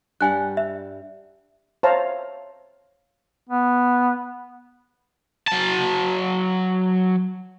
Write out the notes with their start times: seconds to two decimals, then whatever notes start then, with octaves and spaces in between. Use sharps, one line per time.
0.21 G2 G3 F#5 G#5 F#6
0.57 E5
1.83 C5 C#5 E5 F5 A5 A#5
3.49 B3
5.48 F#3 A5